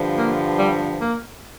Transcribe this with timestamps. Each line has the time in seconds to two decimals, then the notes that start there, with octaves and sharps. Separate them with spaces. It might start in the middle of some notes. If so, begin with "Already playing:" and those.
Already playing: G2 D3 F3
0.15 A#3
0.57 G3
0.99 A#3